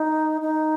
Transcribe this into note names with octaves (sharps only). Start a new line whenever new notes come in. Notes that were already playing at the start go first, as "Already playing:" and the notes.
Already playing: D#4
D#4